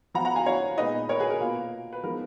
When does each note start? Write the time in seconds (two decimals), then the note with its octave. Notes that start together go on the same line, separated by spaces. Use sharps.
0.14 F3 B3 F4 F#5 A#5
0.25 F#5 A#5
0.35 F5 G#5
0.46 C#5 F5
0.78 A#2 G#3 B3 D#4 B4 D#5
1.09 A#4 C#5
1.19 G#4 B4
1.30 A#4
1.40 B2 A#3 F4
1.93 B4
2.04 F3 G#3 B3 D#4 A#4